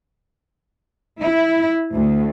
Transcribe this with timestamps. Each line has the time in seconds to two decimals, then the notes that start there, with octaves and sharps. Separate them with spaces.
1.21 E4
1.92 D2